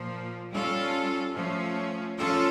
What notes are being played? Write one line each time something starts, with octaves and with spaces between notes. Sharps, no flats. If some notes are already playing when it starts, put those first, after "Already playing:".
Already playing: A#2 F3 A#3
G3 C#4 F4 A4
F3 A3 C#4
F3 C#4 F4 A4